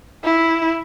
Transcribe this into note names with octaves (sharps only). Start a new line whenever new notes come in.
E4